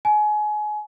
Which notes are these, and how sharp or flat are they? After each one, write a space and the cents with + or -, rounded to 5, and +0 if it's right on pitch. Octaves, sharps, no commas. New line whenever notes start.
G#5 +30